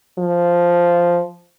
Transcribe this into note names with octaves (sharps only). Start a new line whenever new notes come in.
F3